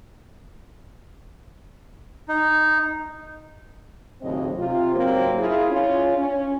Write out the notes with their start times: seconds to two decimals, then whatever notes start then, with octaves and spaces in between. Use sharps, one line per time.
2.28 D#4
4.21 D#2 A2 C#3 F#3 C4 D#5
4.57 C3 F4
4.94 G#2 C#3 F#3 A#3 C4
5.37 E4 F4 G#4
5.70 C#4 F4
6.17 C#4